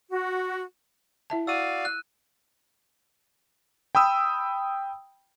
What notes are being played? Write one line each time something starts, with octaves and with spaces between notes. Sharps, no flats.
F#4
E4 E5 A5
F#4 D5 F5 E6 D#7
F#6
G5 B5 D#6 E6